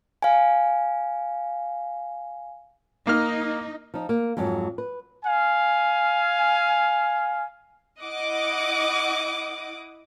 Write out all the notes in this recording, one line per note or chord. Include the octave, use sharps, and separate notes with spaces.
F5 G#5
A#3 D#4 F6
F3 D#4
A#3
F2 G#2 F#3
B4
F5 G#5
E4 D#5 F#5 D6 D#6